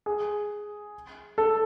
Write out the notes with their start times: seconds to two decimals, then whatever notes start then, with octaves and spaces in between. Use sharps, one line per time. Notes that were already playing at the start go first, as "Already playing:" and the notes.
0.06 G#4
1.38 A4